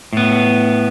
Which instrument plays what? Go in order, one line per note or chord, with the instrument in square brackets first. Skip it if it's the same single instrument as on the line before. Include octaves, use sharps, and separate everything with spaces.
[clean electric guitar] A2 B3